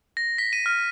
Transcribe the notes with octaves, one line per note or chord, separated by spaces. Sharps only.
A#6
B6
D#7
F6